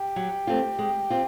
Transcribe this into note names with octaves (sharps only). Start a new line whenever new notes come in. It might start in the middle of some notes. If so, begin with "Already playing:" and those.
Already playing: G4
F#3
A3 C4 F4
G#3
C4 F4